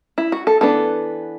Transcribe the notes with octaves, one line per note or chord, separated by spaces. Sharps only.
E4
F#4
A4
E3 B3 D4 A4